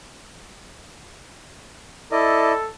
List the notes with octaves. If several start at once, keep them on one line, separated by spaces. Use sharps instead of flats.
E4 A4 D5 D#5